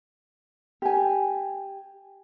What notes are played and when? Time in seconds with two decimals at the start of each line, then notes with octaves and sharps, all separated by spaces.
0.82 G4 G#5